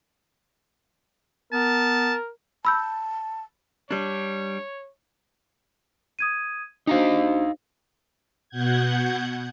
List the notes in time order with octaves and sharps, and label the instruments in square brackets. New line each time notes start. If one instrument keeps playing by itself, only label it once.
[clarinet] B3 [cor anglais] A#4 [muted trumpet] A5
[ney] A5 [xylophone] B5 E6 G6
[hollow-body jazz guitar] G3 D4 [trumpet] C#5
[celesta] D#6 G#6 D#7
[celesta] D4 F#4 C5 [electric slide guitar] D#4 D#5 F5
[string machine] B2 F#5 G6 G#6